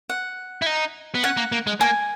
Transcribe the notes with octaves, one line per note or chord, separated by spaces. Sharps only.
F#5
E4
D#4
B3
C#4 F#5
A#3
A#3
G#3
A#3 G#5